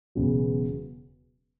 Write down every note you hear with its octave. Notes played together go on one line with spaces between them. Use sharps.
E1 E2 C#3 F#3